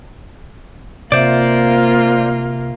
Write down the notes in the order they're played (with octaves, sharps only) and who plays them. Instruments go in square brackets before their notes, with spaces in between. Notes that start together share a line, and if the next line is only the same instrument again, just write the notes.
[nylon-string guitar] C3 E5 [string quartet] A#3 F4 [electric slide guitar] C5 D5